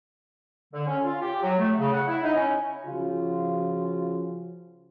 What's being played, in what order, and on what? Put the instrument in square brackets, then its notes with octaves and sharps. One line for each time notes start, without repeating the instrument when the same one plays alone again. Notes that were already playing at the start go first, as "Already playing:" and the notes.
[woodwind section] D3
C#4
F4
G4
F#3
A3
C#3
F#5
E4
D#4
C#4
[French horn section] C#3 F3 F4 F#4